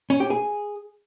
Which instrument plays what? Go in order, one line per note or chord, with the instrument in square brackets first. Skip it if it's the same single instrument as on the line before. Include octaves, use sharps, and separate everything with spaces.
[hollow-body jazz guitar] C#4
G4
G#4